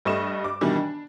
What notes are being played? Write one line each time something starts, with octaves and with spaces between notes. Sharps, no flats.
G2 G3 A3 D#5 C#6 E7
D6
B2 D#3 E3 G3 D4
D4